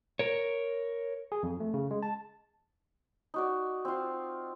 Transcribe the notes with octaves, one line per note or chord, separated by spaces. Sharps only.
A#4 C#5
G#4
F2
A3
C#3
G#3
A5
D#4 F#4 D5
C4 F4